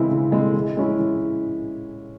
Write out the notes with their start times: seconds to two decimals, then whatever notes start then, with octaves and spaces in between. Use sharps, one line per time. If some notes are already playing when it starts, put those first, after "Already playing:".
Already playing: C#3 E3 G#3 C4 E4
0.11 C#3
0.32 E3 G#3 C4 E4
0.54 E3
0.77 G#3 C#4 E4
0.99 E3